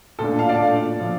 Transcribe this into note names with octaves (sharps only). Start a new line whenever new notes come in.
A#2 A3 D4 A4
F5 A5
D5 F5
A#2 A3 D4
A#2 F3